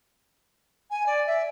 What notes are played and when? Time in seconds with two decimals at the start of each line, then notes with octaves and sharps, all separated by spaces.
0.90 G#5
1.06 D5
1.27 E5